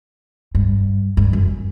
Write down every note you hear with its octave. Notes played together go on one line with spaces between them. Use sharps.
G2
G2
F#2